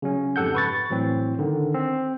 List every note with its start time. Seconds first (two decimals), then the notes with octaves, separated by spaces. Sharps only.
0.02 C#3 F#3 C#4
0.36 F2 G#2 G4 A4 F#5 G6
0.55 B4 C#6 A6
0.90 A2 E3 F#3 C4
1.39 D3 D#3
1.74 C4